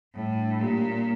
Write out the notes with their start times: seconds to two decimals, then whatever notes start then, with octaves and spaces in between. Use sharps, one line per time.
0.14 A2 G3
0.38 D4
0.61 A#2 G4
0.84 A#3